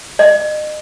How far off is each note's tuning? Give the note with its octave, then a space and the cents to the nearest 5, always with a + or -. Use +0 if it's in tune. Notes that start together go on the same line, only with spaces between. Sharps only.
D#5 -35